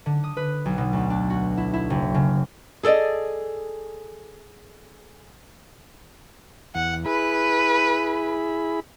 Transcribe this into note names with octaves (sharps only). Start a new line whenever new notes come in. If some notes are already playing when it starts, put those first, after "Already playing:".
D3
D#6
B4
B1
B2
D2
D4
F#4
E4
E4
F#1
C#3
G#4 A4 B4 D5 D#5
E2 F#5
E4 G#4 B4 B5